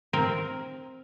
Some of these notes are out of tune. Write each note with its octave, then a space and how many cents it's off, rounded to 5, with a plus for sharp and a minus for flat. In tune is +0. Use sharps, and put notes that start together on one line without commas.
C4 +0 A#4 +0